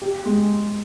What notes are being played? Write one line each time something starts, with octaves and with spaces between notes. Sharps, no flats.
G4
G#3